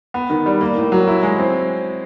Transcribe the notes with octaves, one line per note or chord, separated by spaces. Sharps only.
B3
D#3
G3
A#3
A2
F#3
E4
G#3
C4